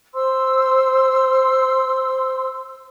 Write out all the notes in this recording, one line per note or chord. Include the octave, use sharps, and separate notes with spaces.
C5 C6 E6